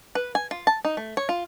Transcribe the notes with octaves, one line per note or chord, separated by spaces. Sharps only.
B4
G#5
F4
A5
D#4
A3
C#5
F4